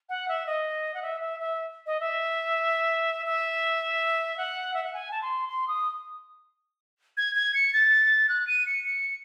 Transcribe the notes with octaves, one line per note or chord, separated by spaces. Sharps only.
F#5
E5
D#5
F#5
E5
E5
E5
D#5
E5
E5
F#5
E5
F#5
G#5
A5
C6
C6
D#6
G#6
G#6
C#7
A6
F#6
D#7
C#7
C#7